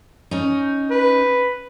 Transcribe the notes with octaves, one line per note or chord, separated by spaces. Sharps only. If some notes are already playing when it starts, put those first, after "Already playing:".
C#4 D#4
B4